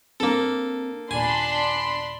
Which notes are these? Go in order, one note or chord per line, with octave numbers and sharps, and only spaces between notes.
A#3 C4 D4 A4
D#2 A#2 D4 G#5 B5 C6